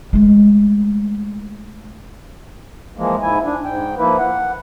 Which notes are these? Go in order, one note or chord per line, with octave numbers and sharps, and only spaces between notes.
G#3 A3
E3 F3 G#3 A#3
G#2 E4 G#5
D4
G#2 G5
F3 A#3 E4 B4
F#5